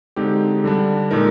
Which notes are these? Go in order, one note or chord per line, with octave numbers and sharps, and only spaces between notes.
D3 G#3 C4 D#4 G4
D3 G3 D4
A#2 G#3 D#4 A#4